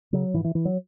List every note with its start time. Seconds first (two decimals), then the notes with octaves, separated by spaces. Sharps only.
0.13 C#3 F#3
0.34 G#2 E3
0.44 E3
0.55 E3
0.65 F#3